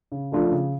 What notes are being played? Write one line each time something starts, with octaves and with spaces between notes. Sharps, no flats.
C#3
F3 A3 D4 F4
C#3